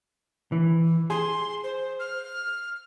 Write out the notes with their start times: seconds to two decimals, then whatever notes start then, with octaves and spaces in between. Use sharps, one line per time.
0.52 E3
1.10 G#4 C6
1.64 C5
2.00 F6